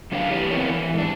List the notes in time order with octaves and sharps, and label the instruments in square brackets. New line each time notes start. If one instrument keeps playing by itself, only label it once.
[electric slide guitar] C#3 F#3 D4 B4 C#5 F5
E3 E4 G4 B4
A3 B3 C4 A#4 C#5
E3
G#2 D4